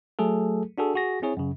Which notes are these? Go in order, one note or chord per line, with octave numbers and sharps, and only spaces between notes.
F#3 A3 G#4 A4
D4 F#4 G#4 A4
F#4 G#4 A#6
C4 E4 G#4 C#5
F#2 C#3